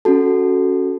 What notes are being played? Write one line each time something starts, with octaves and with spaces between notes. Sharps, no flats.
C#4 F#4 A4 A5